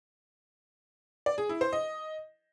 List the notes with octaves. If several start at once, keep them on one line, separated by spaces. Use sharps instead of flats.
D5
G#4
E4
C5
D#5